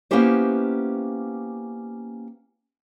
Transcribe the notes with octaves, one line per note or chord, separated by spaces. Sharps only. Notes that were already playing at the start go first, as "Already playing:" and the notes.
A#3 B3 C#4 E4 G4 C5